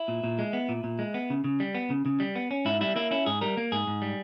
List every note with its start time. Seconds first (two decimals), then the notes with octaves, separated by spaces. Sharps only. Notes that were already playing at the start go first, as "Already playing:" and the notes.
Already playing: E4
0.08 A#2
0.24 A#2
0.39 G#3
0.53 B3
0.69 A#2
0.84 A#2
0.99 G#3
1.14 B3
1.30 C#3
1.44 C#3
1.60 G3
1.75 B3
1.90 C#3
2.06 C#3
2.20 G3
2.36 B3
2.51 C#4
2.65 G#2 E4
2.81 G3 E4
2.96 A#3 E4
3.11 C#4 E4
3.26 G#2 G#4
3.41 G3 A#4
3.57 A#3
3.72 G#2 G#4
3.87 G#2
4.02 G3